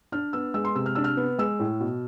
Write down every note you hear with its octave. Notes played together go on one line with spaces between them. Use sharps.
D4 F6
B3 E6
G#3 E6
C6
C3 E6
F6
D4 E6
F6
B3
G#3 E6
A2
B2